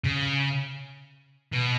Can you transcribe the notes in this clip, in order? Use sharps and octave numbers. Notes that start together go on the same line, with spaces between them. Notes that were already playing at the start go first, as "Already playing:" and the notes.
C#3
B2